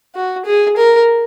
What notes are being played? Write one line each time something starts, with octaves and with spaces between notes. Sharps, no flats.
F#4
G#4
A#4